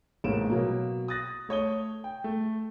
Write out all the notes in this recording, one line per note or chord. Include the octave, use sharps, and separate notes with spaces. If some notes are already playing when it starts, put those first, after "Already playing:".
A1 G#2 A3 A#3 D7 E7
B2 F#3 A#3
D#6 F#6 A6 A#6
A3 C#5 D#6 G7
G5
A3